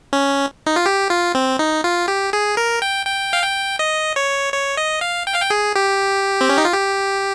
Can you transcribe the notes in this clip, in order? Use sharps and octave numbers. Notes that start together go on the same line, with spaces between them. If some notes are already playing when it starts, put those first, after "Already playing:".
C#4
D#4
F4
G4
F4
C4
D#4
F4
G4
G#4
A#4
G5
G5
F5
G5
D#5
C#5
C#5
D#5
F5
G5
F5
G5
G#4
G4
C4
C#4
D#4
F4
G4